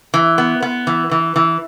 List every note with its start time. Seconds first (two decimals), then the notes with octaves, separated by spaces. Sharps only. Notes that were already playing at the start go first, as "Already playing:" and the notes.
0.14 E3
0.38 B3
0.62 B3
0.87 E3
1.11 E3
1.36 E3